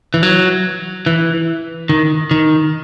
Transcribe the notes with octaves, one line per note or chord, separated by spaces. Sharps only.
E3
F#3
E3
D#3
D#3